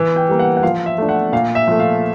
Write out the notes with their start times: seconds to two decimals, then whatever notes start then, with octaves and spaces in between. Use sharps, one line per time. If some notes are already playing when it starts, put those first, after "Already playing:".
Already playing: E3
0.16 G5
0.28 G3 A#3
0.39 F#5
0.57 F#5
0.63 F3 F5
0.86 E5
0.98 A3 D4
1.09 F#5
1.32 A#2 F5
1.55 E5
1.68 F3 A3
1.80 F5